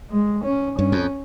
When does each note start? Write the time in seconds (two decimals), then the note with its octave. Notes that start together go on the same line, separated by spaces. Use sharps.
0.11 G#3
0.44 C#4
0.79 G2 C#4
0.92 F2